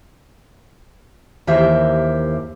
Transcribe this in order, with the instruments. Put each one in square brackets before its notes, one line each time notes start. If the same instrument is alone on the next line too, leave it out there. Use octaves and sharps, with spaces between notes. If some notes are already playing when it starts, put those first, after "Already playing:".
[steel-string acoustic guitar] D#2 E3 G4 A#4 C5 E5